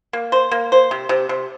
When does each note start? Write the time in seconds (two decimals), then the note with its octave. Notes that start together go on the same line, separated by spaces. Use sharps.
0.13 A#3
0.32 C5
0.51 A#3
0.72 C5
0.91 C3
1.09 C3
1.29 C3